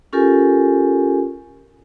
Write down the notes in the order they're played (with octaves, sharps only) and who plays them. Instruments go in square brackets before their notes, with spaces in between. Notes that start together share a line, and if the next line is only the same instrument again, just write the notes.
[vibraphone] C#4 F4 G4 A4 A#4 G#5